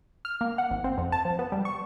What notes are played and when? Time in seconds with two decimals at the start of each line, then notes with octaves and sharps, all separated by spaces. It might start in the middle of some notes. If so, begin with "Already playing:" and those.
0.25 F6
0.41 A#3
0.58 F#5
0.71 G#1
0.84 C4
0.98 F2
1.12 A5
1.25 F3
1.39 B3
1.52 G3
1.65 C#6